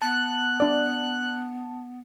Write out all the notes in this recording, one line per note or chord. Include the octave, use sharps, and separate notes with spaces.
B3 A5 F#6
D4 D5